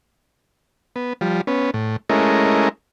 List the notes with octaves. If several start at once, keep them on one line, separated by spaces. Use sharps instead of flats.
B3
F3 G3
B3 C#4
A2
G#3 A3 C#4 E4 A#4 D#5